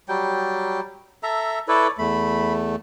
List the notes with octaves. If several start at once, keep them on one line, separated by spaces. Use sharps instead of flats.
F#3 G3 G5
A4 E5 A#5
E4 A4 B4 C#5 D5
E2 A3 B5